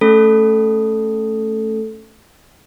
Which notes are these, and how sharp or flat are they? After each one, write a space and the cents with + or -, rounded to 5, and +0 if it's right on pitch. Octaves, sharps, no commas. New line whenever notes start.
A3 +0 C#4 +0 A4 +0